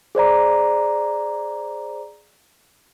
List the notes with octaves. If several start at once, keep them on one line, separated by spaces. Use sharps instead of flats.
G#4 C5 D5 A#5